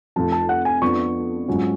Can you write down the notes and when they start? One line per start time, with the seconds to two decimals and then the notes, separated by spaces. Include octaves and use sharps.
0.16 F1 F2 F3 A5
0.32 A5
0.49 F#5
0.65 G#5
0.82 F2 F3 B3 D4 C#6
1.48 G#2 F#3 C#4 F4